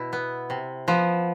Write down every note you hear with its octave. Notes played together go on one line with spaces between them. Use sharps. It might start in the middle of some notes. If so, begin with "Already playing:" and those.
Already playing: B2 E4
B3
C3
F3 B3